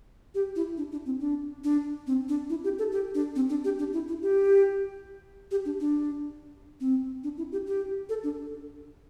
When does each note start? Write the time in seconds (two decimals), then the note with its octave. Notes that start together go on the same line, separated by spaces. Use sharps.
0.35 G4
0.56 E4
0.77 D4
0.92 D4
1.06 C4
1.20 D4
1.64 D4
2.07 C4
2.29 D4
2.50 E4
2.64 G4
2.79 A4
2.92 G4
3.15 D4
3.36 C4
3.50 D4
3.64 G4
3.79 D4
3.93 E4
4.08 E4
4.22 G4
5.51 G4
5.65 D4
5.80 D4
6.81 C4
7.24 D4
7.38 E4
7.52 G4
7.67 G4
8.09 A4
8.24 D4